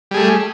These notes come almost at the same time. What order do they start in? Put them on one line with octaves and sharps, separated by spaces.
G3 G#4 A3